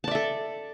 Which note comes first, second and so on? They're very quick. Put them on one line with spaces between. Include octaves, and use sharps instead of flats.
A5 D5 E5 A4